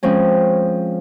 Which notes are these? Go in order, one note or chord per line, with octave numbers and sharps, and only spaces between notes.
F3 G#3 C4 C#4